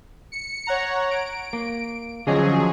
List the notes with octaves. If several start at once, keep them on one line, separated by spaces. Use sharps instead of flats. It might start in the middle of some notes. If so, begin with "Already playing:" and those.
C#7
C#5 F#5 A#5
D7
A#3
D3 F3 F#3 C#4 G#4 D#5